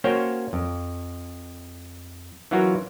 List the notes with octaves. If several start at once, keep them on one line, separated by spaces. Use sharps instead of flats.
A#3 C#4 F#4 C5 C#5 G5
F2
E3 F#3 C#4 F4 F#4 A#4